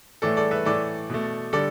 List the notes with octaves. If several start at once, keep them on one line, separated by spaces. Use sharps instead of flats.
A2 E3 A3 A4 D5
A4 D5
B4 E5
A2 E3 A3 A4 D5
B2 A3
D3 G3 A4 D5